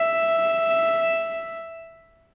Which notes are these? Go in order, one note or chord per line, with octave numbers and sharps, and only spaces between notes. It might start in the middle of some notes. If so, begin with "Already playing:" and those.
Already playing: E5